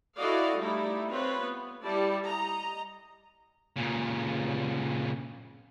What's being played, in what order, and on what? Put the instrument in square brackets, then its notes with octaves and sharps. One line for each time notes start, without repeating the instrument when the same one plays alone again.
[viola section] E4 F#4 A4 D5 D#5 F5
G3 A3 D#4 E4
C4 F4 B4 C#5
B3
G3 E4 D5 A5
D#5 A#5
[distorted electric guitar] A#2 C#3